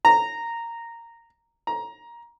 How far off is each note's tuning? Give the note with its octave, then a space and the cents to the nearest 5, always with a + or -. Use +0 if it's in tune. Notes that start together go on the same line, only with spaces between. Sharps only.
A#5 -10
A#5 +15